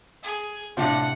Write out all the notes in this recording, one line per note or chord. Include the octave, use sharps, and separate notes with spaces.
G#4
A2 C3 D4 F4 F#5